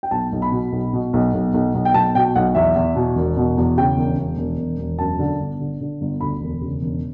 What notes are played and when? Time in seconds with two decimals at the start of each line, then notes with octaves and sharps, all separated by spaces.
0.03 G5
0.11 B1 A5
0.32 B1
0.42 B5
0.52 B2
0.72 B1
0.93 B2
1.13 B1
1.33 B1
1.54 B1
1.74 B1
1.85 G5
1.94 B1 A5
2.15 B2 G5
2.35 B1 F#5
2.55 E2 E5
2.75 E2
2.95 B2
3.16 E1
3.37 B2
3.57 E2
3.77 C#3 G5
3.97 E1
4.17 E1
4.38 E1
4.58 E1
4.79 E1
4.99 F#2 A5
5.19 D3
5.40 G1
5.60 D3
5.81 D3
6.01 G1
6.21 D2 B5
6.41 E1
6.61 C#3
6.82 E1